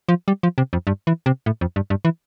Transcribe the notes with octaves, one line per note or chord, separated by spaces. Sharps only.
F3
G3
F3
C3
F2
G2
E3
C3
A2
F2
G2
G2
E3